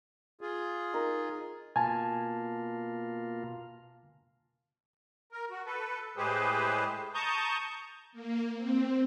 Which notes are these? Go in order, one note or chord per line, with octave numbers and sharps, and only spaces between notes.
F4 G#4
D#4 A#4
B2 A#3 F4 G#5 A5
A#4
F#4
A4 B4
A2 G#3 G4 G#4 B4 C5
A5 A#5 C#6 D#6 G6
A#3
C4